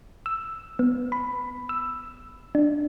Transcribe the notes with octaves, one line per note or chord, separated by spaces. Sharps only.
E6
B3
B5
E6
D4